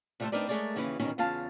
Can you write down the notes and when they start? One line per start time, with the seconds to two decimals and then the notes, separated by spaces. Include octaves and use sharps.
0.20 C3 G3 A3 G#4 A4 C5
0.32 C4 D4 D#4 A#4 B4 D5
0.48 G#3 A3 G#4 A#4 C#5 D5
0.76 D#2 C#3 E3 E4 B4
1.00 E2 B2 D#3 C#4 D#4
1.18 E2 C#3 F4 F5 A5